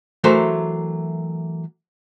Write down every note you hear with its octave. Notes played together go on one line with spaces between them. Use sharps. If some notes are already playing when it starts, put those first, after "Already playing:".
E3 F#3 A3 A#4 C5